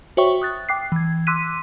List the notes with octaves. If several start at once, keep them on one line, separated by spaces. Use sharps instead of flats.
F#4 C5 C#5 E5 G5 C#6
D#6 F#6 A6
G5 D6 F#6 C7
E3 G#6
C6 D6 E6 F#6 B6 D#7